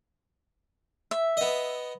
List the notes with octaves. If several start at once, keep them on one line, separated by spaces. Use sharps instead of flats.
E5
B3 D#5